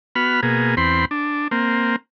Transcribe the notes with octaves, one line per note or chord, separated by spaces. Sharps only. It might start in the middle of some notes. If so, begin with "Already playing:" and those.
B3 F#4 B5 F6
B2 A#3 G#4
E2 C4 B5 C6
D4
A#3 C4